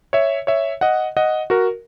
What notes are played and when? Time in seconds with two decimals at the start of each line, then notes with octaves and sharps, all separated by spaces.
0.13 C#5 E5
0.47 C#5 E5
0.81 D#5 F#5
1.17 D#5 F#5
1.50 F#4 A#4